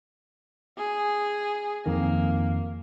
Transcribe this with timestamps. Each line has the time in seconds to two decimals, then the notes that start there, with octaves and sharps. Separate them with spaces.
0.77 G#4
1.86 F2 D#3 A#3